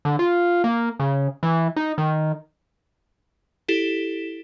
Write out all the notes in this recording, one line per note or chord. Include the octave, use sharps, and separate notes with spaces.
D3
F4
A#3
C#3
E3
D#4
D#3
E4 G4 A4